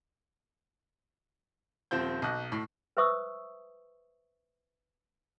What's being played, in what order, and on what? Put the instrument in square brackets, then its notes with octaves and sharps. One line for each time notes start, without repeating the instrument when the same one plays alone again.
[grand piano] D#1 F3 C4 G6
B1 D#5 F#6
A2
[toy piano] B4 C5 E5 C#6 D#6 E6